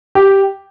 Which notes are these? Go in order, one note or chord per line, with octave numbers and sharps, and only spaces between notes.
G4